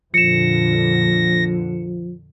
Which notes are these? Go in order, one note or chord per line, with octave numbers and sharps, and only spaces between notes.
F2 A#2 D3 F3 A#6 C#7 E7